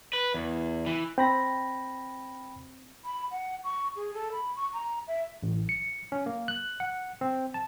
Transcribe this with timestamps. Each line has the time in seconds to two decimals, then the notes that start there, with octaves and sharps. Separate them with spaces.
0.13 B4
0.34 E2
0.86 E3
1.18 C4 G5 B5 A#6
3.05 B5
3.31 F#5
3.64 C#6
3.96 G#4
4.14 A4
4.32 B5
4.56 C#6
4.73 A#5
5.08 E5
5.43 A1
5.69 C#7
6.12 C#4
6.26 A#3
6.48 F#6
6.80 F#5
7.21 C4
7.54 A5